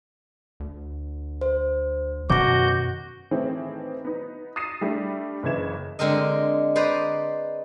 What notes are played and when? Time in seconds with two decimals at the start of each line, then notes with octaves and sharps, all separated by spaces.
0.60 D2
1.41 C5
2.30 F#2 B2 D#3 F#3 F#4 D6 G6 A#6
3.31 A2 D#3 E3 A3 C4 G#4
4.04 B3 D#4
4.56 D#6 A6 A#6 C7 D#7 E7
4.81 G3 A3 D4
5.43 F#1 C#3 E3 E5 G#6 E7
5.99 D3 G#3 C4 A#4 D#5
6.76 B4 C5 D5 D#5 A#5